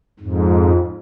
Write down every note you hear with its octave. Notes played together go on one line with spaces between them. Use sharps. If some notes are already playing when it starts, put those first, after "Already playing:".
F2 G#2